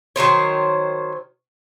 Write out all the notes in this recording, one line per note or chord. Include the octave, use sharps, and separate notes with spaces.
D#3 F#3 C5 C#5